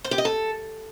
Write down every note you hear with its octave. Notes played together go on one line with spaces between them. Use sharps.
C5
G4
D#5
A4